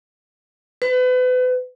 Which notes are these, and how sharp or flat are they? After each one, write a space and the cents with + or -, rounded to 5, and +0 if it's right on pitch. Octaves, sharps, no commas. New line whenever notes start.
B4 +35